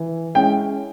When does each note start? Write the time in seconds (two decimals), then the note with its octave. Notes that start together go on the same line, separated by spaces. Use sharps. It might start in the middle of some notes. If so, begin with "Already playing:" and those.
Already playing: E3
0.35 G#3 C#4 E4 G5